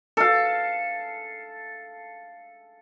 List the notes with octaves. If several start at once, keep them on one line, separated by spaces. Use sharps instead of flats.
A4 F5